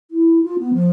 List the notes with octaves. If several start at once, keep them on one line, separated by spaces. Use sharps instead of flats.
E4
F4
B3
F3